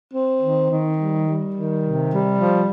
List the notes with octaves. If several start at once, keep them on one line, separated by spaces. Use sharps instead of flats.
C4
D#3
D#3
G3
G3
D#3
C3
G3
F3